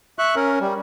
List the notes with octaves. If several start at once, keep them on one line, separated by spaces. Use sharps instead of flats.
E5 C#6 F#6
C#4 A#4
G3